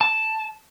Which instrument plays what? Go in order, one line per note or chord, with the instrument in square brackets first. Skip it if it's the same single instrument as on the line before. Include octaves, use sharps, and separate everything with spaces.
[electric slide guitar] A5